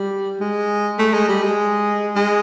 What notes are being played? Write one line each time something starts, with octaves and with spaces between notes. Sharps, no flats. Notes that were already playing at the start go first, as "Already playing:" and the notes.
Already playing: G3
G#3
A3
G#3
G3
G#3
G#3